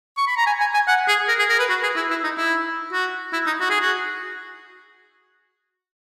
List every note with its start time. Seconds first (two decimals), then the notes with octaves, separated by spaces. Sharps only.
0.17 C#6
0.27 B5
0.37 A#5
0.47 G#5
0.60 G#5
0.74 G#5
0.88 F#5
1.08 G#4
1.29 A#4
1.39 G#4
1.50 A#4
1.59 B4
1.70 F#4
1.83 G#4
1.96 E4
2.11 E4
2.24 D#4
2.38 E4
2.93 F#4
3.33 E4
3.46 D#4
3.61 F#4
3.70 G#4
3.81 F#4